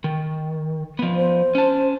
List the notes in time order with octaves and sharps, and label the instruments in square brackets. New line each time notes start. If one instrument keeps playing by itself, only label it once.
[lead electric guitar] D#3
F3 B3
[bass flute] C5
[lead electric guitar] C#4 A5